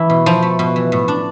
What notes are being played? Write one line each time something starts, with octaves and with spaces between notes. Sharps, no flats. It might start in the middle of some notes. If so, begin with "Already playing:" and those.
Already playing: E3 A3 E4
B2
B2 F3
A3
B2
E3
A2
D4